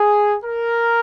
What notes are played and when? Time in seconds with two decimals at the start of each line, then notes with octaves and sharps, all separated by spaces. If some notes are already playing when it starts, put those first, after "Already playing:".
Already playing: G#4
0.44 A#4